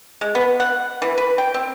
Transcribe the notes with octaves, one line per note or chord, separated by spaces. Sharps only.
G#3
B3
F#5
E3
B4
G5
C4